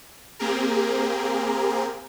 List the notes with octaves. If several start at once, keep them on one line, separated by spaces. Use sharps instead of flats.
A#3 C4 G4 G#4 A#4